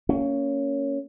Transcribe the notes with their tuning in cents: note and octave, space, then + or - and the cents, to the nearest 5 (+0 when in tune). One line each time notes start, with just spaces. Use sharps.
A#3 -20 C#4 +10